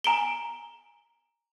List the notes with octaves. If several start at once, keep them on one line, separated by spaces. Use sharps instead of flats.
G#5 A#5 D7 G7